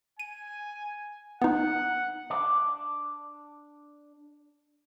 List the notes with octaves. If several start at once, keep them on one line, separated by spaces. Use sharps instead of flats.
G#5 D#7
B3 D#4 F#5
D4 D5